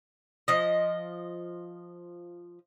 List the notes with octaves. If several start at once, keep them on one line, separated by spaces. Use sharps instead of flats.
F3 D#5